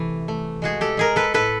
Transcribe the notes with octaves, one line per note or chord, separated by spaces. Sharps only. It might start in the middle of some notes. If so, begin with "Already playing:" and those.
Already playing: C3 E3 A3
A3
G#3 F#4 G#4
G4 A4
G#3 G#4 A#4
A4 B4
A2 A4 B4